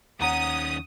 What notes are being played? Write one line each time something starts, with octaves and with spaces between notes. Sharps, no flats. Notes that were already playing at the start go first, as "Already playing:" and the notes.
D#2 D#3 C#4 F#5 A#5 D#6